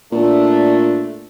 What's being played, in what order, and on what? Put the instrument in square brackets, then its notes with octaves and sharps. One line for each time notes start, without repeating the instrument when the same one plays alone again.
[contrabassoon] A#2 [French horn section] A3 D4